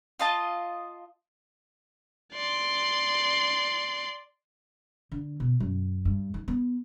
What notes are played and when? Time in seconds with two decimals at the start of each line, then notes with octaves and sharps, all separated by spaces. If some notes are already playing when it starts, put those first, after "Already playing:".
0.19 F4 D#5 A5
2.33 D5 C6
5.12 D3
5.40 B2
5.60 F#2
6.05 G2
6.34 D#3
6.48 B3